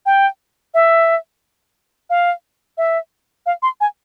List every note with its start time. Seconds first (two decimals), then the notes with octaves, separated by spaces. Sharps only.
0.06 G5
0.74 E5
2.10 F5
2.78 E5
3.46 F5
3.63 C6
3.81 G#5